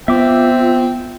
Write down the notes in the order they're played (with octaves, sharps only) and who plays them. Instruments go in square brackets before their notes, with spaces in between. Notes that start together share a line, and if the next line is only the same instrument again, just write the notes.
[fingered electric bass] B3 [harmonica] C4 G5 [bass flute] F4 [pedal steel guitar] E5 D6